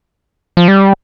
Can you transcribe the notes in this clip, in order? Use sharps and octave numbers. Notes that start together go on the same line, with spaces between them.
F3
G3